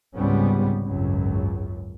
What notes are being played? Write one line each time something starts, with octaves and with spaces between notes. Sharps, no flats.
C#2 G#2 C3 G3 B3 C#4
G#1 C#2 F#2